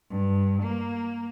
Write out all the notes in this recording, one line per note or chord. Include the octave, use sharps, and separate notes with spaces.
G2
A#3